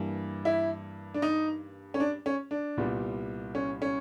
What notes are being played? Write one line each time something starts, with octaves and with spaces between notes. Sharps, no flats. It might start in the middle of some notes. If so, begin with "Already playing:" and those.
Already playing: G2 E3 G3 A#3
E4
D4
D#4
C#4
D4
C#4
D4
C2 A#2 G3 B3
C#4
C#4